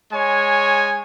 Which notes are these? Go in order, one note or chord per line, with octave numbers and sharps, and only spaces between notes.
G#3 C#5 G#5